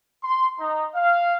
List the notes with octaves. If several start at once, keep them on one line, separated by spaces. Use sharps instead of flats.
C6
D#4
F5